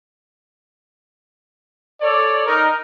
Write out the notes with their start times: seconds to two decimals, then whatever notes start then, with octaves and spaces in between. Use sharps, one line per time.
2.01 A4 C#5 D5
2.47 D#4 A#4